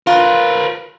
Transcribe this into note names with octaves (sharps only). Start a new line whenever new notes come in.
F4 A#4 B4